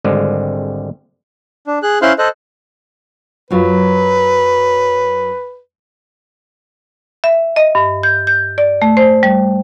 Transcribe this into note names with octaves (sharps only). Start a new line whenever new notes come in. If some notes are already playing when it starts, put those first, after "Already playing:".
G#1 D3 G3 G#3 C4
D4
G#4 F#6
C#4 E4 C5 F5 C6 F#6
A4 C5 D#5 F#6
F#2 F#3 F4 B4
E5
D#5
G2
G6
G6
D5
A3
C5
G3